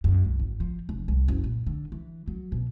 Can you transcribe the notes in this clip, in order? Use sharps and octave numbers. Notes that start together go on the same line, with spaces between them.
F#2
C2
G#1
F3
F1
C2
F#1
A#2
D3
E3
F#3
B2